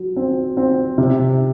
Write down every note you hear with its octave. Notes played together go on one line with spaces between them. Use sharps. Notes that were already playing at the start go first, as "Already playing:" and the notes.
Already playing: F#3
C4
C4
C3